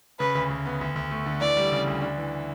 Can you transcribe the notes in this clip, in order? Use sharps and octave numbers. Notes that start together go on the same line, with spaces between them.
C#3 B4
D2
D2
B3
D2
D2
A3
D3
E3 D5
G3
C#3
D2
D4
E3